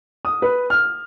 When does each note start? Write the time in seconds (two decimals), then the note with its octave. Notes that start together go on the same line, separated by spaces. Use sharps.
0.25 D#6
0.42 B4
0.70 F6